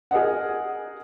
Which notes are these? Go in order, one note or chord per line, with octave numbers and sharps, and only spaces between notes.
G#4 A#4 D#5 F#5